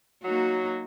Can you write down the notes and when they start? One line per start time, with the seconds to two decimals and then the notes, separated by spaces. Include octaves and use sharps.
0.24 F#3 A#3 D#4 F#4